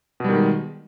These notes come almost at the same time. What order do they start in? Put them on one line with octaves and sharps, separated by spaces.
B2 G3 D#3 G#3